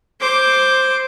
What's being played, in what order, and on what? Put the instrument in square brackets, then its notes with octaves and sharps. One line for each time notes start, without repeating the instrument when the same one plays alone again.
[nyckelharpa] C5 D6